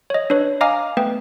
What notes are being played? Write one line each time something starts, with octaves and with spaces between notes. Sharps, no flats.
C#5 D#5
D4 B4 C#5
D#5 F5 G#5 A#5 D6 F6
A3 B3 B4 G5